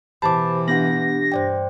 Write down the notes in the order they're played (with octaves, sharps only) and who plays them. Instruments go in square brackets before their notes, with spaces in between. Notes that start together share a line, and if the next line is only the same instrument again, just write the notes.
[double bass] B2 E3 [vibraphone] G4 C5 [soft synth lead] A5 [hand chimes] B5 D6
[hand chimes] B3 F#5 [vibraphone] D4 G4 [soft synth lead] A#6
[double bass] G2 [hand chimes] C5 D5 G5